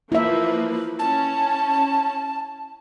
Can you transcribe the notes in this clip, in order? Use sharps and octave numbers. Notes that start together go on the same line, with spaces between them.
F3 A#3 E4 B4 E5
C#4 A5